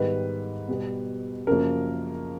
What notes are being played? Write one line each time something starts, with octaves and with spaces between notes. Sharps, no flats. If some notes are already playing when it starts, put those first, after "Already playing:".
Already playing: G#2 D#3 G3 B3 B4
B2 G3 B3
F#2 C#3 F3 A#3 A#4